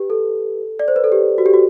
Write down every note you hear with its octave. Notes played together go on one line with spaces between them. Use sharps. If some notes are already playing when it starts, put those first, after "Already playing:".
Already playing: G4 B4
A4
D5
C5
B4
A4
G4
F#4
G4
F#4